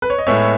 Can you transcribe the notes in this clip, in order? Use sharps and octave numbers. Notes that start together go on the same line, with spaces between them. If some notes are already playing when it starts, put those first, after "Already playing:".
B4
C#5
D#5
A2 G#3 B3 C#5 E5